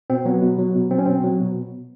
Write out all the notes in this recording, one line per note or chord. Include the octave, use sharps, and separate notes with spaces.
B2 C4
F#3 B3
B2
F#3
B2
F#3 C4
C#4
B2 C4
F#3
B2